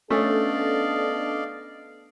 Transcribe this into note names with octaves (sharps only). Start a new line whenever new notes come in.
A3 B3 C#4 D4 A4 D5 D#5 F5